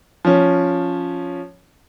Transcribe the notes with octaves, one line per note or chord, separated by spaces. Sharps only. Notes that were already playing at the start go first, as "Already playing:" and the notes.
F3 C#4